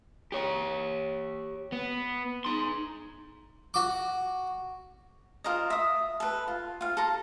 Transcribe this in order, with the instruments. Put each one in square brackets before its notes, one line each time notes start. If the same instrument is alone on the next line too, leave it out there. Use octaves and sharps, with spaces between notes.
[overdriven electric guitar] G4 C#5
B3
D#4 C6
[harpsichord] F#4 D6
[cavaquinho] F4 A#4 C5 D#5
E5 D#6
A4 B4
F4
F4 F5
A4 A#5